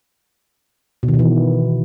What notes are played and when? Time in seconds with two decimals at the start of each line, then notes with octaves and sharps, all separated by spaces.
1.03 B2
1.08 D#3
1.14 B2
1.19 E3